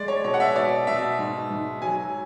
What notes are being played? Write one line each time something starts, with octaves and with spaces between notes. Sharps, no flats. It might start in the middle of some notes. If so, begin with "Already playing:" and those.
Already playing: G#3 D5
C#5
B2 C#5
F#5
E5
B2 D5
B2 E5
G#2
G#2
F#3 G#5